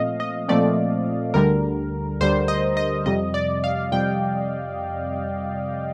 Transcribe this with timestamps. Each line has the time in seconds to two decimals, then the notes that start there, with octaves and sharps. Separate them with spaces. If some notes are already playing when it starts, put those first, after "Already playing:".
Already playing: A#2 F3 A3 C4 D#5 F5
0.20 D#5
0.48 A#2 F3 A3 C4 D5
1.34 D2 D3 G3 A#4
2.20 D2 D3 G3 C5
2.48 D#5
2.77 D#5
3.06 F2 C3 G3 D#5
3.34 D5
3.64 F5
3.92 F2 C3 G3 G5